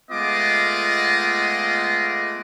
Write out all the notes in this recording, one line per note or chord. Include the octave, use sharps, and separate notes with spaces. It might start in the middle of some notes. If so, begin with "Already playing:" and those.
G#3 A3 B3 F4 D#5 D6